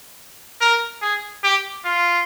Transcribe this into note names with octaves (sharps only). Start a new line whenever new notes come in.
A#4
G#4
G4
F4